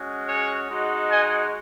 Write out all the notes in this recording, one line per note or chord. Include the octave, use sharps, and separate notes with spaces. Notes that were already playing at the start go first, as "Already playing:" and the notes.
Already playing: G#3 C#4 F#4
G#4 C#5
G#3 D#4 F#4
D#5 G#5